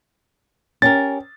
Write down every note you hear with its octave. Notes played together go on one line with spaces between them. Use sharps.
C#4 G4 A#4 A6